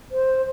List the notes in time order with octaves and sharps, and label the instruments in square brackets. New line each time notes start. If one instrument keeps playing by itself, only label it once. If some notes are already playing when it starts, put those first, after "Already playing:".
[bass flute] C5